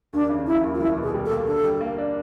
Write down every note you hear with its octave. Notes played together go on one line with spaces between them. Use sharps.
D#2 D4
C#3
F3 E4
D#2
F4
C2 E4
B2
G#4
G3
A4
A#3
D3 A4
G3
A#3
D4